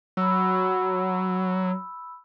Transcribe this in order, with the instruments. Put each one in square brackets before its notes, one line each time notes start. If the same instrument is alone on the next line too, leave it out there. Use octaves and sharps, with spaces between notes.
[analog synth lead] F#3 [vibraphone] B5 E6